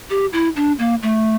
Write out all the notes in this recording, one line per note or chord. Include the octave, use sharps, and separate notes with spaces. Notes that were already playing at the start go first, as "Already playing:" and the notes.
G4
E4
D4
A#3
A3